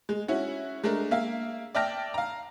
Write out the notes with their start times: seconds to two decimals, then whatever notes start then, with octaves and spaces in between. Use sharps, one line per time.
0.09 G#3
0.28 C#4 E4 F#4
0.84 G#3 A3 D4 A#4
1.11 A#3 E5 F5
1.75 D5 E5 G5 A5 F6 A#6
2.14 F5 A#5